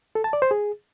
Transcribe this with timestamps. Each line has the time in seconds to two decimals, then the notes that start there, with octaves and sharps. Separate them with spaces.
0.15 A4
0.24 A5
0.33 D5
0.42 C5
0.51 G#4